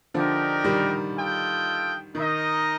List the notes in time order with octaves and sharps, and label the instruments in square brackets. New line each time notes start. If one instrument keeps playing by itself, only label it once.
[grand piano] D3 F3 [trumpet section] D#4 G4 A#4 D5
[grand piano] D#3 G3
[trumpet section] F4 A4 D#5 G5
[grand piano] D#3 [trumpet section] D#4 A#4 D#5